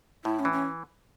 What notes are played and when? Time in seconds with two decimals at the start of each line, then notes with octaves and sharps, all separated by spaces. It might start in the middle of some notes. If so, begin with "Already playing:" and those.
0.25 A2 E4
0.39 C#4
0.45 E3
0.52 C#4